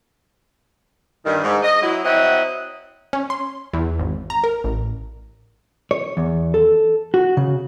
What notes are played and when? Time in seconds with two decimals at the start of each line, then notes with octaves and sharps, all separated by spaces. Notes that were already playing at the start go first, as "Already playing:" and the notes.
1.25 G2 D#3
1.44 G#2
1.62 D#5
1.82 F#3 E4
2.04 F#3 C4 E4 D#5 F#5
3.13 C#4
3.30 C6
3.74 E2
3.99 G#1
4.30 A#5
4.44 A#4
4.64 A1
5.91 C#5
6.17 E2
6.54 A4
7.14 F#4
7.37 C#3